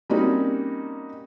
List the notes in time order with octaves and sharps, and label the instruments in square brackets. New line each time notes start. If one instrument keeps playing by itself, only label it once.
[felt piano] G3 A#3 C4 C#4 D#4 F#4